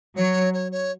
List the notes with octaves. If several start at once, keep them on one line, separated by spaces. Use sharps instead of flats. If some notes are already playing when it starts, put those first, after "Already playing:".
F#3 C#5
C#5
C#5